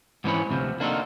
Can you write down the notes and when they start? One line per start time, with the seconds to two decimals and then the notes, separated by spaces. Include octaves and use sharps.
0.24 G#2 E3 C4 C#4 C#5 B5
0.50 D2 C3 F3
0.80 A#3 D4 D#4 F4 F#4 A4